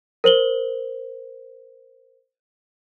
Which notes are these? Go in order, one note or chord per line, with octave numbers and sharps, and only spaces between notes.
A#4 C5 F#7 G7